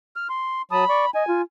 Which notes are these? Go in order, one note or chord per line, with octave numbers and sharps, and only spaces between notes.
F6
C6
F#3 A5 B5 D#6
D5 C#6
D#5 G#5
F4